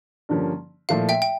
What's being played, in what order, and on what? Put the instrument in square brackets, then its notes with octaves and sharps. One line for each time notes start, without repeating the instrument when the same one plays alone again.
[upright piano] G2 D3 F3 A#3 C#4
[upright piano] A#2 F3 A3 E4 [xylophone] F5
[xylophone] E5 G5
G5